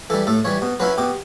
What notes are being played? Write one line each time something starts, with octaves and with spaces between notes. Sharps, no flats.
E3 G3 A4
A2 A4
E3 G3 C#5
B2
F#3 C#4 E4 B4
B2 G4